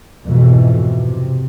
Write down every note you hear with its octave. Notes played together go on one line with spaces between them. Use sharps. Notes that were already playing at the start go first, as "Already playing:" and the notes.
F2 G#2 B2 E3
C3